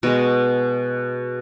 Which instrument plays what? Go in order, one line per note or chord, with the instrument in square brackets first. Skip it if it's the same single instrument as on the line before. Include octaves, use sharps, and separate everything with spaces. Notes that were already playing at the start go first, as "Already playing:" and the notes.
[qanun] B2 G#3